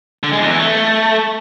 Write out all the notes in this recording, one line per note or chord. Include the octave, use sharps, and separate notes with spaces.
D3
G#3
E2
E3
A3